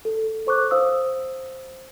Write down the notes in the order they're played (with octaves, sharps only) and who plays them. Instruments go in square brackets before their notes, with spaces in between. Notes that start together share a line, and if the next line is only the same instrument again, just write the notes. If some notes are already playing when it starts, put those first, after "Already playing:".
[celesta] A4
A4 C5 C#6 D6 F#6
C5 F5 D#6 E6